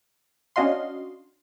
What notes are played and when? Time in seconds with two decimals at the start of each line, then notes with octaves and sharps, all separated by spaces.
0.56 C#4 D4 F#4 D#5 F5 C6